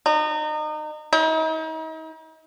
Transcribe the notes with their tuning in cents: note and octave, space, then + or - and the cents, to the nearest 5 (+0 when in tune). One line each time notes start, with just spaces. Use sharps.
D#4 -30
D#4 +40